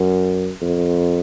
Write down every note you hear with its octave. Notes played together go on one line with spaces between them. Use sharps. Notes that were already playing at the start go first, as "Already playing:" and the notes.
Already playing: F#2
F2